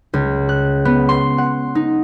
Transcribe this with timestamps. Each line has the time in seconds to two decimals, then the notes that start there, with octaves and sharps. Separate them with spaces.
0.14 C#2
0.49 F#6
0.85 B3
1.09 C6
1.38 F#5
1.75 D#4